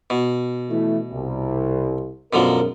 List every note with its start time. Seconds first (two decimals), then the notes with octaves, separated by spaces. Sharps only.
0.10 B2
0.70 E3 A3
1.12 C2
2.33 G#1 F#2 B2 D3 F3 A#4